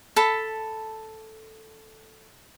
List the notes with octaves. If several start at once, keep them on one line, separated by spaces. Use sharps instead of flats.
A4 A5 B5